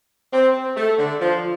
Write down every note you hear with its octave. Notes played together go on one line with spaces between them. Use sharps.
C4
A3
D3
F3